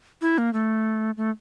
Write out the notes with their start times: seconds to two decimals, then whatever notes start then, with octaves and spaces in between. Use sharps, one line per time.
0.21 E4
0.38 A#3
0.53 A3
1.17 A3